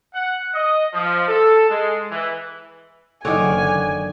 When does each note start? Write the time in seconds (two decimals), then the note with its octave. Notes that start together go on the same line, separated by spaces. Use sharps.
0.14 F#5
0.54 D#5
0.93 F3
1.27 A4
1.70 G#3
2.10 E3
3.25 F#1 D3 D#3 C#5 D5 F#5 G#5